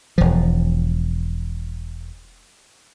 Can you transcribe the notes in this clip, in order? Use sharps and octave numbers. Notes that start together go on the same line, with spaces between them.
E1 F3